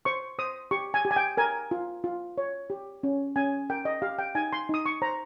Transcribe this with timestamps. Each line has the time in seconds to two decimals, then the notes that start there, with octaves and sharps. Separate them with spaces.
0.05 C5 C#6
0.39 C5 D#6
0.71 G4 C#6
0.94 G#5
1.05 G4
1.11 G#5
1.16 G5
1.37 A#4 G#5
1.71 F4
2.04 F4
2.38 C#5
2.70 G4
3.03 C#4
3.36 C#4 G#5
3.70 A#4 G5
3.85 D#5
4.02 G4 F5
4.19 G5
4.35 D#4 G#5
4.53 C6
4.69 D#4 D#6
4.86 C#6
5.02 C5 A#5